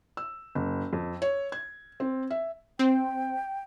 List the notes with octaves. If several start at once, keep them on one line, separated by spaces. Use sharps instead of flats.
E6
F#1
F2
C#5
G#6
C4
E5
C4 G5